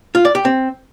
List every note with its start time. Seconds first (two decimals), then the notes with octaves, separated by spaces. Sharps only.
0.15 F4
0.25 D5
0.35 G4
0.45 C4